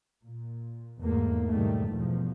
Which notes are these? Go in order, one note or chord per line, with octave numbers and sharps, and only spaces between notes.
A#2
E2 G#2 A3 A#3
G#2 B2 D#3 G3 A3
E2 G2 B2 F3